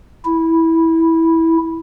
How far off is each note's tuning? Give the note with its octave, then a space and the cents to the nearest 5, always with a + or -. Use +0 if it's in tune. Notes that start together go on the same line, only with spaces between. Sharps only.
E4 -10